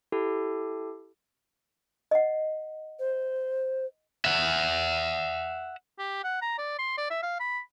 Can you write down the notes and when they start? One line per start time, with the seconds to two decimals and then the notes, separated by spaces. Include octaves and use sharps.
0.12 E4 G4 A4
2.11 D#5 F#5
2.99 C5
4.25 E5 F#5
5.99 G4
6.24 F#5
6.42 A#5
6.58 D5
6.78 C6
6.98 D5
7.10 E5
7.23 F5
7.40 B5